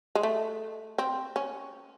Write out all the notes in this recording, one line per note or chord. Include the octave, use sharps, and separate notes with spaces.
G#3
A3
C4
C#4